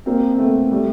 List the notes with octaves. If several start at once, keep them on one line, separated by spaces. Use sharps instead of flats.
A#3 C4
C4
A3 B3
G3 A3